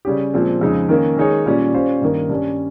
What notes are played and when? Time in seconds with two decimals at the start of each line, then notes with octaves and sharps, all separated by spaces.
0.05 C#3 G3 C#4 G4
0.34 A#2 F3 G#3 C4
0.61 F2 C#3 G#3 D#4
0.89 D#3 A#3 C#4
1.18 D#3 G#3 D#4 G#4 C#5
1.46 A#2 G3 C#4
1.74 G3 C#4 F4 C5
2.02 G2 D#3 A#3
2.30 G2 G3 C#4